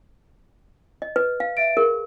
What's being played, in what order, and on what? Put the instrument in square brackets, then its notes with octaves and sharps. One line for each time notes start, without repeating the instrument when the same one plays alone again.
[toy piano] D#5
B4
F5
[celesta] E5 A6 D7
[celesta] G#4 [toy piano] A#4